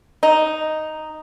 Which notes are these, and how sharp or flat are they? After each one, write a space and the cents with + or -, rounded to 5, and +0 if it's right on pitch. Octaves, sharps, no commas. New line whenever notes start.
D#4 +0